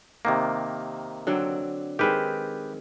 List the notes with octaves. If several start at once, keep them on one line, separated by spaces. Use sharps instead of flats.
C3 D#3 A#3
D3 F#3 C4
D#3 G#3 C4 G4 B4